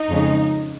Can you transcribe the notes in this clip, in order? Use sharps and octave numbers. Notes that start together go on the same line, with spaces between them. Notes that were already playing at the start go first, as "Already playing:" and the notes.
Already playing: D#4
F2 C#3 G#3